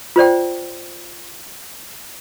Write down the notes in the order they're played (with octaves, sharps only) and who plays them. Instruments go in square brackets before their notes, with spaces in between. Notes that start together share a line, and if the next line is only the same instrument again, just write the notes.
[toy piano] F4 C5 D5 G5